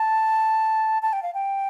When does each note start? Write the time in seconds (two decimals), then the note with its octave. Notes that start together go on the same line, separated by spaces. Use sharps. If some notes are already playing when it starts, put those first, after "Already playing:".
Already playing: A5
1.03 A5
1.13 G5
1.23 F5
1.34 G5